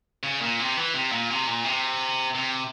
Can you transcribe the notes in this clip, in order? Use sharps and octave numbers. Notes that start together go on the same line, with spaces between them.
C#3
A#2
C3
E3
C3
A#2
C3
A#2
C3
C3